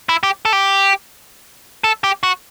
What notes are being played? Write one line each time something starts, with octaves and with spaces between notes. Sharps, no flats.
E4
G4
A4
G4
A4
G4
F#4